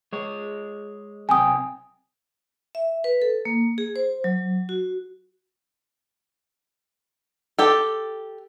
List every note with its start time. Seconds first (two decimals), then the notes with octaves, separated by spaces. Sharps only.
0.13 G#3 C#5
1.29 B1 C3 G5 G#5 D#6
2.75 E5
3.04 B4
3.22 A4
3.45 A#3
3.78 G#4
3.96 C5
4.24 F#3
4.69 F#4
7.58 G4 A4